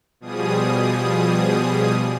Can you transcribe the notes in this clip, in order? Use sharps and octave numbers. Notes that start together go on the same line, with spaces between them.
B2 F3 G3 G#4 D#6